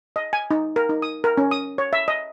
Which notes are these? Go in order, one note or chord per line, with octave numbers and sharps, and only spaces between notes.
D#5
G#5
D#4
A#4
D#4
D#6
A#4
C#4
D#6
C#5
E5
D#5